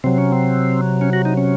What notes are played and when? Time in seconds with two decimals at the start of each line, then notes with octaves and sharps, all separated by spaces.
0.04 C3 F#3 C4
0.18 C#4
0.32 C4
1.01 C#4
1.13 F#4
1.25 D#4
1.37 C#4